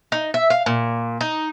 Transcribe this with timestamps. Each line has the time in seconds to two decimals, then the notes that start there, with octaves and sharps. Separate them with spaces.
0.12 D#4
0.34 E5
0.50 F5
0.66 A#2
1.21 D#4